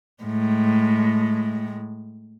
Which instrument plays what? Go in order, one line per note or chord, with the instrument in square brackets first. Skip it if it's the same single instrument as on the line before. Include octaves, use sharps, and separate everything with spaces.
[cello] A2 G#3